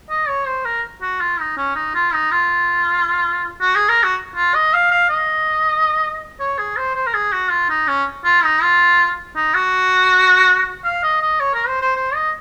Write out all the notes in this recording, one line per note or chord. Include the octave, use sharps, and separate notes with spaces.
D#5
C#5
C5
A#4
F#4
F4
D#4
C#4
D#4
F4
D#4
F4
F#4
G#4
A#4
F#4
F4
D#5
F5
F5
D#5
C#5
G#4
C5
C5
A#4
G#4
F#4
F4
D#4
C#4
F4
D#4
F4
D#4
F#4
F5
D#5
D#5
C#5
A#4
C5
C5
C5
D#5